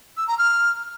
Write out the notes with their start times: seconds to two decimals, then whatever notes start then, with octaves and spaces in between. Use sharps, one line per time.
0.17 E6
0.27 A#5
0.38 F6